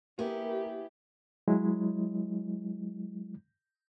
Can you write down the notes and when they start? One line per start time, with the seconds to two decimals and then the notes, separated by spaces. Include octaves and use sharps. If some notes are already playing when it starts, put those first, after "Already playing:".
0.19 A#3 B3 E4 G4 G#4
1.48 F#3 G#3 E4